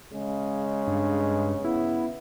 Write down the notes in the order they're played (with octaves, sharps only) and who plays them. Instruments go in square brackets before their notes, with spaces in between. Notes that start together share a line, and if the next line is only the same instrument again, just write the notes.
[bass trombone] C#3 [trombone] G#3
[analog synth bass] G2
[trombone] B3 [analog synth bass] E4